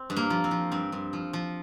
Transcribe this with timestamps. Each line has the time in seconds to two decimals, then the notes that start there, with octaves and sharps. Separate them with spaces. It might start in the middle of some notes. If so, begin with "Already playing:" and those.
Already playing: C4
0.10 G2
0.16 A#3
0.30 F3
0.44 C4
0.51 F3
0.72 G2 C4
0.92 G2
1.13 F3
1.33 F3